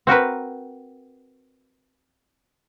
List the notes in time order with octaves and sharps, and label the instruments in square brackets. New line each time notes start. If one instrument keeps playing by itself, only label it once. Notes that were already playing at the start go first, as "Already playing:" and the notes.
[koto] C4 F#4 A#4 B4